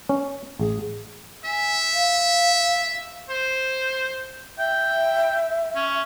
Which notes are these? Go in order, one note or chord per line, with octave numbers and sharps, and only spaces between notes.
C#4
A1 G#4
E5 G#5
F5
C5
E5 G5
C#4